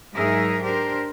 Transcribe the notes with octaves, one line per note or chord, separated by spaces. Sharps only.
G#2 F#3 D#4 G#4 A#4 E5
D4 G4 A#4 C5